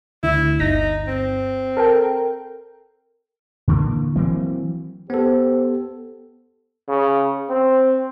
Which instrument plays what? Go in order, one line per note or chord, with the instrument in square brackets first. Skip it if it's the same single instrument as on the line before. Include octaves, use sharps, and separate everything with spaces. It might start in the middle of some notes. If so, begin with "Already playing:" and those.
[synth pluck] D2 [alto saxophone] E4
[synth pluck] G1 A#6 [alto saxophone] D#4
[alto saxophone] C4
[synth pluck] A4 A#4 G5
[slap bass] A#2 D3 E3 A#3
E3 F#3 A#3 C4
[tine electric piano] B3 A4 [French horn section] G4 C5
[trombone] C#3
C4